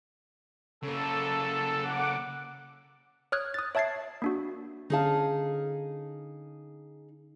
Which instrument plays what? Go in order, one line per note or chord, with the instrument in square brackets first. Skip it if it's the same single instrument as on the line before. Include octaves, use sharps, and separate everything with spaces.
[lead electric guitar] C#3 A#3 [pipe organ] A4
[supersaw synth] F#5 D6
[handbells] C#5 D#6 F6 F#6 G#6
D#6 A6
C#5 E5 A5 G#6 A6 C7
A#3 D4 F#4
[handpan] D3 C#4 F5 [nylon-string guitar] D#4 G#4 A5